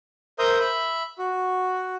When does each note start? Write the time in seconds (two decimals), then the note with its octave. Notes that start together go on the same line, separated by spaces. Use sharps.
0.39 A#4 C5 E5 A#5 D#6 G6
0.60 E5 B5
1.19 F#4